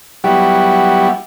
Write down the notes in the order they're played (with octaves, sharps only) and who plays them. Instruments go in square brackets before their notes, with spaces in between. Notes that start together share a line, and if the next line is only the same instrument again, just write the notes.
[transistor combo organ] F#3 G3 B3 E4 F#4 G4